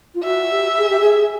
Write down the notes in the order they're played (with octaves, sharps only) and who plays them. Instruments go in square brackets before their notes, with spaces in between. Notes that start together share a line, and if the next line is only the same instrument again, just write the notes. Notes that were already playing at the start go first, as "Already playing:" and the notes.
[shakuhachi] F4
[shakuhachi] F#4 [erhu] E5
[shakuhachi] G4
G#4
G4
G#4